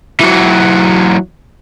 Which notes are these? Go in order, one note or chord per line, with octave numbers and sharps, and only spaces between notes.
E3 F#3